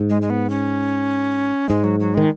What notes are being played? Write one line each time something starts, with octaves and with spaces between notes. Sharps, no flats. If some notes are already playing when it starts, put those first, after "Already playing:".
Already playing: G#2
G#3
G#3
B3
C#4
G#2 G#3
F#3
F#3
D#3 G#3